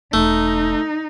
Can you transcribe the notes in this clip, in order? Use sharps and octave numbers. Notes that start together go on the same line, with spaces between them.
E1 A3 D#4